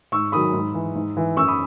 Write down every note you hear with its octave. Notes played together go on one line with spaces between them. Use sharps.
G#2 C#6 E6
D#3 F#3 B5 D#6
G#2
E3
G#2
E3
F#2 C#6 E6
B5 D#6